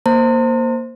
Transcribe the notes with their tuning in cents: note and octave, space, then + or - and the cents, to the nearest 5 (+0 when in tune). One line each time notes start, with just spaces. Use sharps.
A#3 +5 C5 +0 A#5 -45